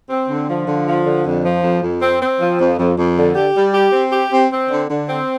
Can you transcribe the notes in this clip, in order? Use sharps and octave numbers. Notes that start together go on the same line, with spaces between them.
C4
D3
F3
D3
F3
D3
F2
F3
F2
F2
C4
C4
F3
F2
F2
F2
D3
G4
G3
G4
C4
G4
C4
C4
D3
D3
C4